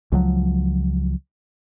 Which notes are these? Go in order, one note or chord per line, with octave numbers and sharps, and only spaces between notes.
C#2 F3 F#3